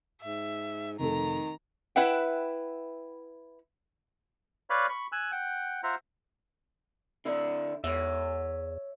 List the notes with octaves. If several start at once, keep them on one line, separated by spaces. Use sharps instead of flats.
G#2 E5
F1 D#3 A4 A#5
E4 B4 E5 F#5 G5
B4 C#5 D5 F5 B5
B5 C#6
G#5 E6 F#6
F#5 G5
F4 C5 E5 F#5 A#5
D3 E4 D5
E2 C#5 E5